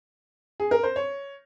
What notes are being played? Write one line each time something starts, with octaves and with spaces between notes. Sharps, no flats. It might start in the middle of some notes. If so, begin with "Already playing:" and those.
G#4
A#4
C5
C#5